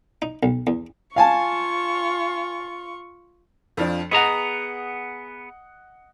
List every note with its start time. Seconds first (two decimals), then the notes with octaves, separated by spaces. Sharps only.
0.22 D#4
0.43 B1
0.67 E2
1.16 F4 F5 G#5 A5 C#6
3.77 F2 F3 D4
4.11 B3 G#4 D#5 F#5 A#5